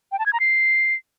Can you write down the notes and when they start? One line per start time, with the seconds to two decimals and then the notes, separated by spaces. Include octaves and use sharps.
0.12 G5
0.19 A5
0.26 G#6
0.33 A#5
0.40 C7